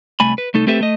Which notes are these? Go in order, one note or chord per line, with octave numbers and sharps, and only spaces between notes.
C2 A3 G#5 B5
B4
C2 A3 D#4 A4
A3 C4 G4 A4 B4 E5
A3 D#5